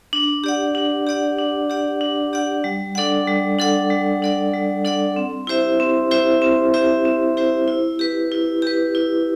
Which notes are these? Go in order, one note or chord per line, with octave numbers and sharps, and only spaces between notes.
D4
G4 D5 F#5
D4
G4 D5 F#5
D4
G4 D5 F#5
D4
G4 D5 F#5
G3
D4 A4 D5 F#5
G3
D4 A4 D5 F#5
G3
D4 A4 D5 F#5
G3
D4 A4 D5 F#5
C4
E4 G4 C5 E5
C4
E4 G4 C5 E5
C4
E4 G4 C5 E5
C4
E4 G4 C5 E5
E4
G4 B4
E4
G4 B4
E4